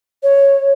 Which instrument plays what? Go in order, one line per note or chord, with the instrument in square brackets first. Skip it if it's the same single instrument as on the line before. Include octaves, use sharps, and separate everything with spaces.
[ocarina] C#5